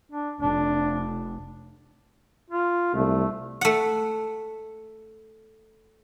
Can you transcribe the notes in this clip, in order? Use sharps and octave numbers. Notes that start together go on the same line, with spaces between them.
D4
F1 D4
F4
C2 A3
A3 F#5